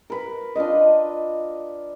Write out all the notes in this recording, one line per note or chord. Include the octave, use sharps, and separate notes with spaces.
A#4 B4
D4 F4 B4 D#5